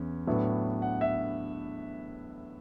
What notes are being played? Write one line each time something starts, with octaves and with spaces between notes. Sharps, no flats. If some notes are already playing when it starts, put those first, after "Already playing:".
Already playing: E2 C#4
A2 F#3 B3 D4
F#5
E5